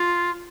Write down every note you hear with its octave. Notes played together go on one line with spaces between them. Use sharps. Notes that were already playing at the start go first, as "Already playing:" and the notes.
Already playing: F4